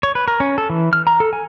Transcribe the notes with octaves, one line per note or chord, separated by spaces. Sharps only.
C#5
B4
A#4
C#4
A4
E3
F6
A#5
A4
G#5